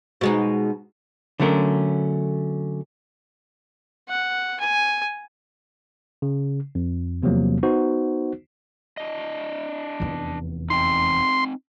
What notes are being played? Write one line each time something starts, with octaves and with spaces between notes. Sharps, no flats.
B2 G#3 D#4
D3 F#3 A3 C#4 A#4
F#5
G#5
C#3
F2
E2 C3 F3 F#3 A#3
B3 D#4 F#4 C5
D4 D#5
F1 E2
C4 D#4 C6